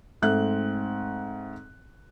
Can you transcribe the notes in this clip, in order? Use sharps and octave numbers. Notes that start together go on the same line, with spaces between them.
G#2 A3 C4 E5 F#6